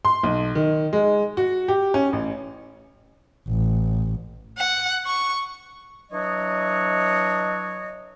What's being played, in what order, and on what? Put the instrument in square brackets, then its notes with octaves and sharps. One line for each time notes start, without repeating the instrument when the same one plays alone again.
[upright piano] C6
B1
D#3
G#3
F#4
G4
C#4
A1
[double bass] A1
[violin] F#5
C#6
[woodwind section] E3 F#3 D4 C#5 D#5